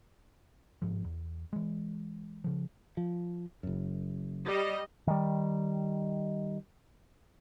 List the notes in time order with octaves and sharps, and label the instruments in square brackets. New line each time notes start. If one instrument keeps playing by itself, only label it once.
[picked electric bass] G1 C#2 G#2 F3
E2
E3 G#3
C#3 F3
[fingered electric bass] F3
F#1 F#2
[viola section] G3 D#5
[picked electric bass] D#3 G3